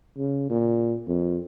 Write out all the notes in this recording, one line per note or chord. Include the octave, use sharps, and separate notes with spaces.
C#3
A#2
F2